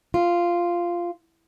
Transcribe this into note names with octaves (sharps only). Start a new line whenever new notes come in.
F4